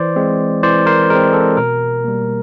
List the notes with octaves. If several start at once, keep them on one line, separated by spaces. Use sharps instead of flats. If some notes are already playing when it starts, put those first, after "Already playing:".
Already playing: E3 C5 D5
G#3 C4
E3 C5 D5
A#4 C5
G#3 C4 A#4
A4
B2 A#4
G3 A#3